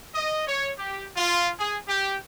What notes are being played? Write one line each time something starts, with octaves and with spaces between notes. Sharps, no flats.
D#5
C#5
G4
F4
G#4
G4